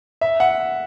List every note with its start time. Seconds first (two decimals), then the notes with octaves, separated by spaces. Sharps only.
0.21 E5
0.40 F#5